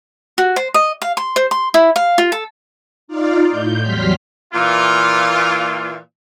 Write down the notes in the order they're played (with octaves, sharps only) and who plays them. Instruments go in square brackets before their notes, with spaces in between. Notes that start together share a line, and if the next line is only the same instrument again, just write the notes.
[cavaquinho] F#4
C5
D#5
F5
C6
C5
C6
E4
F5
F4
A4
[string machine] D#4 F4 D5 F5
A2 G6
E2 F#3 G3 C6 F6 B6
[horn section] A#2 E3 F4